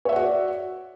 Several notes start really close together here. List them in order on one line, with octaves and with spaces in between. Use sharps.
C#5 E5 F#5 F#4 D5